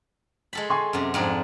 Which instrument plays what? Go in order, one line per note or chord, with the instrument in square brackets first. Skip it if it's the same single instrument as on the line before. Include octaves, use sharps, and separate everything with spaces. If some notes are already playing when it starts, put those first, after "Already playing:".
[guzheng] G#3 A4 B5
[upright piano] G#5 C6 C#6
[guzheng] F#2 C3
F2 G#2 D4